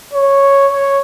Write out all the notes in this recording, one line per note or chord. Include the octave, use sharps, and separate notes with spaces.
C#5
C#5